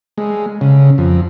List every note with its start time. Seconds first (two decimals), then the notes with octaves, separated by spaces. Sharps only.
0.18 G#3
0.61 C#3
0.98 F2